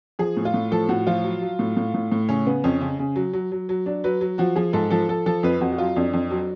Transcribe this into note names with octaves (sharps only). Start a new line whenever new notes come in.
F3 G#4
A2
F4
A2
F3 A4
A2 F#4
F3 F4
F#3
F#3
A2
A2
A2
A2
C#3 C#4
C#3 B3
F2 C#4
C#3
C#3
F#3
F#3
F#3
F#3
F#3 D4
F#3 B4
F#3
F3 F#4
F3 G#4
G#2 A4
F3 A4
F3 A4
F3 A4
F2 B4
F2 F#4
F#4
F#3 F4
F2 D4
F2
F#3